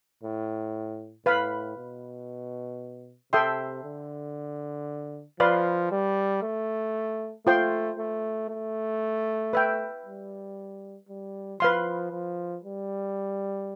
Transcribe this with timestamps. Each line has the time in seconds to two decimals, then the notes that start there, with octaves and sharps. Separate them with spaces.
0.23 A2
1.26 A2 B4 F5 B5
1.77 B2
3.33 C3 A4 E5 G5 C6
3.84 D3
5.40 F3 B4 D5 F5 C6
5.92 G3
6.43 A3
7.46 A3 F4 C5 G5 C6
7.98 A3
8.49 A3
9.53 B4 E5 G5
10.05 G3
11.09 G3
11.60 F3 B4 F5 C6
12.11 F3
12.64 G3